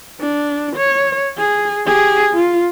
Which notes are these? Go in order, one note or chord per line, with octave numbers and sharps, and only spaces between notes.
D4
C#5
G#4
G4 G#4
F4